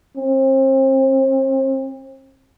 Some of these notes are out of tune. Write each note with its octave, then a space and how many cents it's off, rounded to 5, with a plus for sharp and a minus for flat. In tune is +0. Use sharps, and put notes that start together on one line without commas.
C4 +35